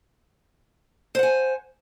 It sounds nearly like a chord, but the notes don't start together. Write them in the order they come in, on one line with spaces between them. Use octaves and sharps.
C5 F#5 G#5